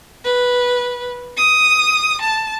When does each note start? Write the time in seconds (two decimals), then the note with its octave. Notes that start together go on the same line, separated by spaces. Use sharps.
0.24 B4
1.37 D#6
2.21 A5